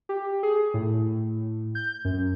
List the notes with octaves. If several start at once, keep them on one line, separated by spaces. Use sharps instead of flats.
G4
G#4
A2
G6
F#2